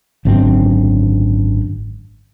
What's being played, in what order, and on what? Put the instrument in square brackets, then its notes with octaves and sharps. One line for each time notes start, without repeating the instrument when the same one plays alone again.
[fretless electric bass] G#1 F#2 D3 C4